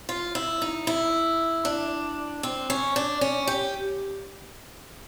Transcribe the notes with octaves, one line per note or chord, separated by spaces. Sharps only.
F4
E4
D#4
E4
D4
C4
C#4
D4
C#4
G4